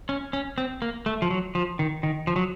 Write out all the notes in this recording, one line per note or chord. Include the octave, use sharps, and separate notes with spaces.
C#4
C#4
C4
A#3
A3
F3
F#3
F3
D#3
D#3
F3
F#3